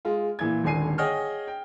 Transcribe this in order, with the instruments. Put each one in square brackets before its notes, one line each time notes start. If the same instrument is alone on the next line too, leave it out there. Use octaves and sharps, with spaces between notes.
[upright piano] G#3 F4
A#2 E3 G#6
D#1 G#1 D3 G#5 C7 D#7
G#4 C#5 D#5 F#5 G5 F6
G5